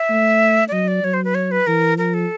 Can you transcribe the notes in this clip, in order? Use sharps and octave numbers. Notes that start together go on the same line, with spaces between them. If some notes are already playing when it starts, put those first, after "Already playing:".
Already playing: E5
A3
D5
F#3 D#5
D5
F#3 C#5
C5
B4
C#5
B4
E3 A#4
F3 A#4
A4